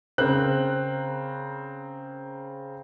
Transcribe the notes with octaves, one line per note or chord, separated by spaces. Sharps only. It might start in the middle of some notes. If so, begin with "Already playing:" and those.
C#3 C4 A#4 F#6 F#7